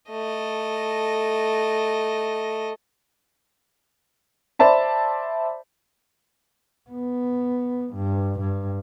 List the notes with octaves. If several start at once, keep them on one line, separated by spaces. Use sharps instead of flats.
A3 D#5
C5 D5 E5 A5 B5
B3
G2
G2